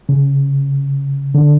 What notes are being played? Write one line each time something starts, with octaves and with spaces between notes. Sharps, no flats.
C#3
D3